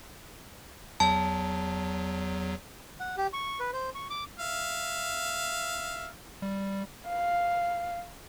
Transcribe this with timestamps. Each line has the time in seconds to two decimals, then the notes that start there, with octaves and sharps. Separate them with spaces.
1.00 E2 F#3 A5
3.00 F#5
3.17 G4
3.33 C#6
3.60 B4
3.73 C5
3.95 C#6
4.10 D6
4.39 E5 F5
6.42 G3
7.08 F5